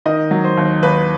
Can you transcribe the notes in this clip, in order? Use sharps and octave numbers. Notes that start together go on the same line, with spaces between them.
D#3 D#5
F#3
C5
D#2
D#2 B4